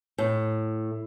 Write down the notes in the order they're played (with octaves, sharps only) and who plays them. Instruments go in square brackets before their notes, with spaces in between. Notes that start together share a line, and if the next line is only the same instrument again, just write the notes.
[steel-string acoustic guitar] A2